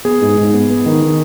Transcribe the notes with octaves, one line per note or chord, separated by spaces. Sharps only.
B3 G#4
G#2
G#2
B3
B3
D#3
D#3